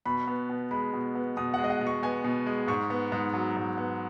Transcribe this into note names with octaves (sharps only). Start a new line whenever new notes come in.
B2 B5
B3
B2
G#3 B5
B2
B3
B2 D#6
G#3 F#5
D#5
F#5
B2
C#6
B3 G#5
B2
G#3
G#2 C#6
B3
G#2
F#3
G#2
B3